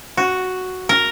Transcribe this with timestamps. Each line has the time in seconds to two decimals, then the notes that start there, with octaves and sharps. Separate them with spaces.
0.17 F#4
0.89 A#4